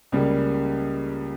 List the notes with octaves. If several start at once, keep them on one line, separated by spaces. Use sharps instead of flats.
C#2 C#3 G3 A#3